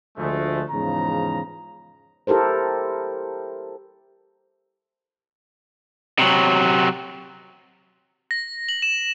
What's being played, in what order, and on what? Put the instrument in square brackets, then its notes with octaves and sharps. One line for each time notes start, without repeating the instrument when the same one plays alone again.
[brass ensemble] D2 F3 G#3 A3
E2 G#2 C#3 F3 A#5
[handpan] E4 G4 A4 A#4 C5
[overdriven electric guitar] C3 F#3
[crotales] A#6
F#7
E7